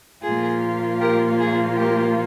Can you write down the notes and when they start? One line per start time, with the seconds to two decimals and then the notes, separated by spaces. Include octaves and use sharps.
0.23 A#2 F3 A#3 F4 G#4
1.00 G4 A#4
1.39 G#4
1.77 G4 A#4